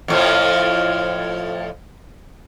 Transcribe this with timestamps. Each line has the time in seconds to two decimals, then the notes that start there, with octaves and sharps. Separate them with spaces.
0.08 F2 A2 F3